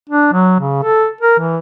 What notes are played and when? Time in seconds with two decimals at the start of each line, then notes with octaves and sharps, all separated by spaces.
0.10 D4
0.33 F#3
0.60 C#3
0.83 A4
1.21 A#4
1.39 E3